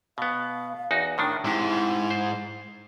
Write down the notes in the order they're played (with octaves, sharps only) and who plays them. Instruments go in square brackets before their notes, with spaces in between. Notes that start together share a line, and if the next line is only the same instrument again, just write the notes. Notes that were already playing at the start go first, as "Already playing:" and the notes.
[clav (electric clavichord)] B2 B3 [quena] F5
[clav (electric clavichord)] E2 D#4 F#4
[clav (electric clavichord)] A2 D#3 D4 [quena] D#6
[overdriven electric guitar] G#2 [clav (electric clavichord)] C3 [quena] E4
[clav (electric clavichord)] C5